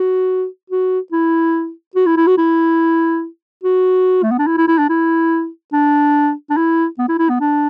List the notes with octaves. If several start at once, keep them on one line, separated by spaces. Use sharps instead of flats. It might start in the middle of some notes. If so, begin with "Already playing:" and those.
Already playing: F#4
F#4
E4
F#4
E4
E4
F#4
E4
F#4
A3
B3
D4
E4
E4
E4
D4
E4
D4
D4
E4
B3
E4
E4
B3
D4